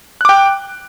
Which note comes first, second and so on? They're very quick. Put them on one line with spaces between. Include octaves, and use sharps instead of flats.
F#6 D6 G5